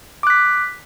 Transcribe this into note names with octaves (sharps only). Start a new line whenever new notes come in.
D6 F#6 B6